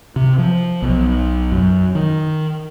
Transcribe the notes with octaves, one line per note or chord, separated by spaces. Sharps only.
C3
F3
B1
F#2
D#3